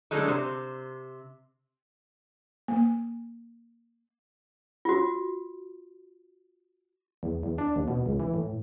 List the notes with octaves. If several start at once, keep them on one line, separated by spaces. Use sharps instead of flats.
D3 E3 F#3 G#3 A3
C3 C5
A#3
F4 F#4
E2
E2
D4
D#2
B2
C#2
E3
A2